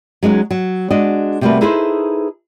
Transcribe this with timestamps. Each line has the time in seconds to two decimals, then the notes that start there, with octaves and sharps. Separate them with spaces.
0.23 F#3 G#3 C#4 D#4
0.51 F#3
0.91 G#3 D4 F#4 D#5
1.41 C3 G3 A3 A#3 F#4 B4
1.61 D#4 E4 G#4 A4 B4 C5